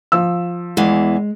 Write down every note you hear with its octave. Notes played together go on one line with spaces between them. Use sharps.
F3 E6
E2 E3 G#3